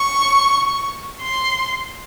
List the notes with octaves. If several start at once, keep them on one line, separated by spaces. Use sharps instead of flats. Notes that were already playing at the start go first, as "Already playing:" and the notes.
Already playing: C#6
C6